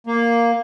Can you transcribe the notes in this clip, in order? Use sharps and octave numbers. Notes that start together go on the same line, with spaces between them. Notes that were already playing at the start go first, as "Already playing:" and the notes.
A#3